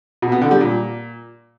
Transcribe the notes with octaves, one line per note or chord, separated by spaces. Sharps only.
B2
B3
D3
G3
A#2